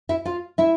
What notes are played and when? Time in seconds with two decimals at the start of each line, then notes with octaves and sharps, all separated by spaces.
0.09 E4 E5
0.26 F4 F5
0.58 E4 E5